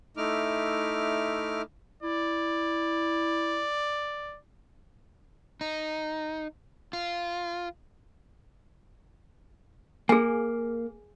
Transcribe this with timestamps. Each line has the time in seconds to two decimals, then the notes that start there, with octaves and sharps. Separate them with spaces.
0.17 A3 D#4 E4 D6 F6
2.03 E4 D5
5.61 D#4
6.93 F4
10.09 A#3 G#4 G#5